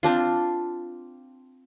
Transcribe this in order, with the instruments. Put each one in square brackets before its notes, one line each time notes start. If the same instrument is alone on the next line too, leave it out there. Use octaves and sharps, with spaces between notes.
[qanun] C4 D4 F4